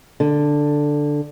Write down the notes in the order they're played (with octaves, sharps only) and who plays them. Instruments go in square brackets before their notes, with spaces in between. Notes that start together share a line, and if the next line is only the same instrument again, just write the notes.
[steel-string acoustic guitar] D3